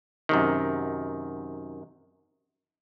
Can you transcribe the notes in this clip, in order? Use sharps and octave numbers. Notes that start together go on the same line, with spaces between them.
F#2 C3 D#3